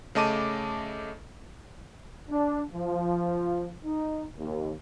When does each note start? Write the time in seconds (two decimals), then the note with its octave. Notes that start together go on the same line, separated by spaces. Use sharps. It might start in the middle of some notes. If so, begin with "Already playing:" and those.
0.15 C#3 A3 D#5 A5 D6 D#7
2.29 D4
2.73 F3
3.85 D#4
4.37 D#2